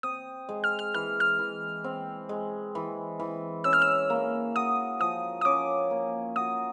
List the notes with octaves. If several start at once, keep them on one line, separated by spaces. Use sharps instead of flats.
C4 D#6
G#3
F6
F6
E3 F6
F6
E3
C4
G#3
E3
E3
C#4 E6
F6
E6
A#3
F#4 D#6
F3 D#6
D#6
C#4 D6
A#3
F#4 D#6